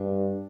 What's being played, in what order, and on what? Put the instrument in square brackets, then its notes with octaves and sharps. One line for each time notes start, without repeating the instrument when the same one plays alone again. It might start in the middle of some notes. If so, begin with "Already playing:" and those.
Already playing: [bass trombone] G2 [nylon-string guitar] D4